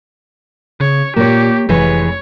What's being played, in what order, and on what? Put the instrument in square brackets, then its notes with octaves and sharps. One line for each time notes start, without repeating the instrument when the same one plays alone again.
[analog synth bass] C#3 [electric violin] C#5
[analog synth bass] A#2 [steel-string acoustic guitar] A#3 C#5 [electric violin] G4
[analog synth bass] F1 [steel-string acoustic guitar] E3 G#3 B4 [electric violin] C#5